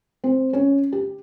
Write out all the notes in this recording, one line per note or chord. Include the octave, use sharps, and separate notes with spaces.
C4
C#4
G4